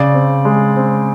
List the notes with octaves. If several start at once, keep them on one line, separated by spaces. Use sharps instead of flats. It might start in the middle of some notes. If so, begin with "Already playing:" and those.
Already playing: C#3 D5
C4
G#3
C4